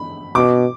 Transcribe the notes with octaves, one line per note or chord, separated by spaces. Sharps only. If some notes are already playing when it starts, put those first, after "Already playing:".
Already playing: B5
B2 D6